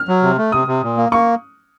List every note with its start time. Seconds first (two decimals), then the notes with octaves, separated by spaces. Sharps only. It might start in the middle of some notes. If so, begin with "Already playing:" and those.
Already playing: F6
0.08 F#3
0.23 C3
0.38 A3
0.52 C3 D#6
0.67 C3
0.82 A#2
0.97 A#3
1.12 A#3 C#6